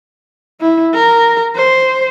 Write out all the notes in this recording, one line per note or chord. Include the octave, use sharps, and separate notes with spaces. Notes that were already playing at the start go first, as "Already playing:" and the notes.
E4
A#4
C5